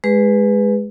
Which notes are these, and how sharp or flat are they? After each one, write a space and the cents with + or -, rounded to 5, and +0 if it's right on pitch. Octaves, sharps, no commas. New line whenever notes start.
G#3 +10 G#4 -35 B4 +0